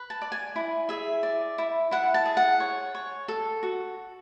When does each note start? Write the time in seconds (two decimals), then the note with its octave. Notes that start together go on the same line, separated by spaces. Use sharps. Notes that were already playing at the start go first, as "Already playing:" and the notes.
Already playing: B4
0.10 A5
0.22 D5
0.32 G#5
0.56 E4
0.89 G#4 E5
1.23 D5
1.58 E4
1.91 E4 F#5
2.14 A5
2.26 G#4
2.37 F#5
2.60 C#5
2.95 C#5
3.28 A4
3.63 F#4